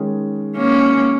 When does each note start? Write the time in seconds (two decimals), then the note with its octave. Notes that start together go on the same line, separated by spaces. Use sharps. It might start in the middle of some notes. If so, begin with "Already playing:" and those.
Already playing: D#3 G#3 C#4
0.56 A#3 C#4